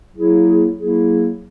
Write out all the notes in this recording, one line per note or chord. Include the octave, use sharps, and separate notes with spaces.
F#3 A#3 E4 G#4
F#3 A#3 E4 G#4